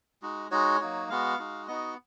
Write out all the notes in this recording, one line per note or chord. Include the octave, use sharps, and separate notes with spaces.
G#3 D#4 F#4
G#3 D#4 F#4 C#5
F#3 A#3 D#4 F#4
G#3 B3 F#4 F5
G#3 D#4 F#4
B3 D#4 F#4 D#5